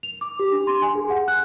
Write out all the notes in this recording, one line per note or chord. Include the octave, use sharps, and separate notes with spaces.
F7
D6
G4
D4
C6
G#5
G#4
F#5
F#6